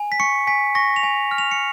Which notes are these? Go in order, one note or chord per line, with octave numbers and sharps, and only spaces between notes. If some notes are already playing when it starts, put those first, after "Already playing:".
Already playing: G#5
B6
C#6 C#7
G#5 B6
C#6 A#6
F7
G#5
F6
F7
C#7